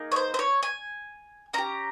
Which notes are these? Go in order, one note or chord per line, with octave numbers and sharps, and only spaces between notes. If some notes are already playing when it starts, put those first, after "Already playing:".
Already playing: A#3 D#4 G#4
C#5
C5
C5
C#5
G#5
C#4 G4 A#5